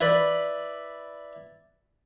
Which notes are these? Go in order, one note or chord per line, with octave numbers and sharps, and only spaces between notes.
E4 B4 D5 B5